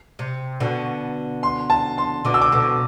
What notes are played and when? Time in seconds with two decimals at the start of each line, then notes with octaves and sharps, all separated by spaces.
0.19 C3
0.60 B2 D3
1.43 C6
1.70 A5
1.98 C6
2.25 B2 D3 D6
2.34 E6
2.42 D6
2.52 B2 D3 D6